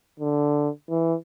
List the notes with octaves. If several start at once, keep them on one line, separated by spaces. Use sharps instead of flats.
D3
E3